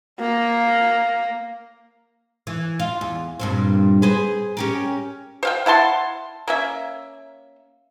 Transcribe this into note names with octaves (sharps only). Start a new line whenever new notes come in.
A#3
E3
F4
E2
G2 A#2 C4
G#4 B4 C5
C#4 G4 A#4
C5 F5 G5
E4 F#5 A5 C6
A#3 C#4 E5